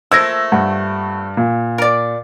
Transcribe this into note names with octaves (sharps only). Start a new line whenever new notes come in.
F3 A3 A#3 E6 G#6 A#6
G2 F#5
A#2
A#4 D5